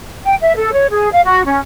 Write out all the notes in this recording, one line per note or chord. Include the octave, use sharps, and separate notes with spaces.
G5
E5
A4
C#5
G#4
F5
F#4
C#4